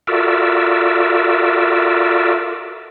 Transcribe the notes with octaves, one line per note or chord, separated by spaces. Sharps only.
F4 F#4 A4 A#4 D5 E5